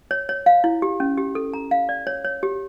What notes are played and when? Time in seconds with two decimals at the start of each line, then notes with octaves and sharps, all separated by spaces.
0.11 C#5
0.29 C#5
0.46 F5
0.64 E4
0.82 G4
1.00 C#4
1.18 G4
1.35 A4
1.53 A#5
1.71 F5
1.89 D5
2.07 C#5
2.25 C#5
2.43 G4